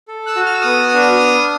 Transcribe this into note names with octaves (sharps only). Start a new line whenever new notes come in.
A4
E6 F#6
F#4
F6
E6
B3 D#6 F6
D4